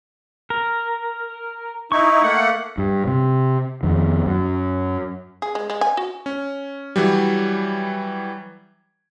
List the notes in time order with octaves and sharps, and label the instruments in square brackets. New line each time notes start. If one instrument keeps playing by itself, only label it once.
[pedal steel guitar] A#4
[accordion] D#4 E4 [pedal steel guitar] C#6
[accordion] A3 A#3 F#5
[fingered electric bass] G2
C3
F2 D#3
F#2
[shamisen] G#4
G#3
G#3
G#5
F#4
[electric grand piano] C#4
E3 F#3 G3